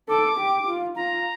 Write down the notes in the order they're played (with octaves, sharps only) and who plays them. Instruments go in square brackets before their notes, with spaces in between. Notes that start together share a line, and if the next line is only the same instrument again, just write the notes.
[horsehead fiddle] A4 [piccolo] D6
[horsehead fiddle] G4
F4
[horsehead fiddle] F4 [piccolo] A#5